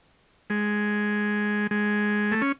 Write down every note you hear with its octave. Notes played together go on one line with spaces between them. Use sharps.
G#3
G#3
A3
C#4